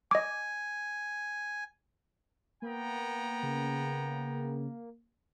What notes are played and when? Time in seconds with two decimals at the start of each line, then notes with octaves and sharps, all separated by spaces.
0.11 D#5 G#5 D6
2.62 A#3 B3 G5 A#5
3.43 C#3